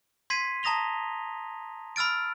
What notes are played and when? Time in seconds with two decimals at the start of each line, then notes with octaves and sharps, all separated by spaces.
0.30 C6 G#6 B6 C7 D#7
0.63 A5 A#5 D#6 A#6 F7 G7
1.96 B5 E6 F6 A6 D7